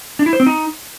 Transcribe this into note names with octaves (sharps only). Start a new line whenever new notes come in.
D4
E4
C5
C4
D#4